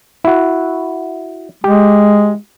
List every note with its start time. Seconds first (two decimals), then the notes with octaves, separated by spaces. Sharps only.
0.24 E4 F#4
1.64 G#3 G4